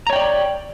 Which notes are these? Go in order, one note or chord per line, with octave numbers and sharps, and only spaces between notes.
C#5 D5 G5 A#5